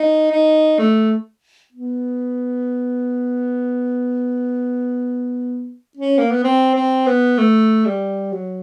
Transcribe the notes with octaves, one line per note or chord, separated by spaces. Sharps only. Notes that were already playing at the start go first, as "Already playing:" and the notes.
Already playing: D#4
D#4
A3
B3
C#4
A#3
B3
C4
C4
B3
A3
G3
F#3